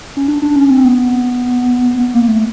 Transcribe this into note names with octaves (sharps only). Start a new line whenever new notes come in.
C#4
D4
D4
C#4
C4
B3
B3
A#3
A3